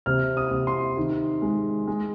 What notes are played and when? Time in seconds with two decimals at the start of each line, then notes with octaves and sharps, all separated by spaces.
0.06 C3 F6
0.37 D#6
0.51 C3
0.67 C6
0.97 D#3
1.42 G#3
1.87 G#3